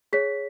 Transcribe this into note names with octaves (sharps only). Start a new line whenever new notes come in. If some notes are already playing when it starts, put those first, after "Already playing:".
G#4 C#5 B6